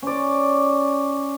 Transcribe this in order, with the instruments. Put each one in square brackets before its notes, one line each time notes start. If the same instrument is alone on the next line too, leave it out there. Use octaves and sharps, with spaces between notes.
[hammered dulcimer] C#4 D5